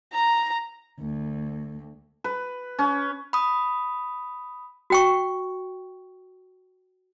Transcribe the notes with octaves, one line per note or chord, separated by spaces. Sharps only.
A#5
D2
B4
C#4
B5 D#6
F#4 G5 C#6